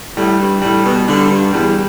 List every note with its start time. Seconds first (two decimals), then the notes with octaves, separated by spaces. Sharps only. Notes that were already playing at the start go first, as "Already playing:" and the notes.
0.17 A2 G3
0.39 G2
0.62 A2 G3
0.84 B2
1.07 D3 G3
1.31 G2
1.53 E2 G3